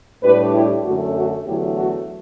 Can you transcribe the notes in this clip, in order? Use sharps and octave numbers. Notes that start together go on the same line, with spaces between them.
A2 G3 D4 G4 B4
E4 G4
F#2 D3 A3 F#4
F#4
E2 D3 F#3 A3 E4 G4
F#4